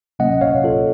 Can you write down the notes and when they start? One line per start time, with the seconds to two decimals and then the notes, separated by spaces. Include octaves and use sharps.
0.19 C3 F#3 A#3 C#4 D#5 F#5
0.41 C#5 F5
0.64 F4 A4